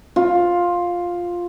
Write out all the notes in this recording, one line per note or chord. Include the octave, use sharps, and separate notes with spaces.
F4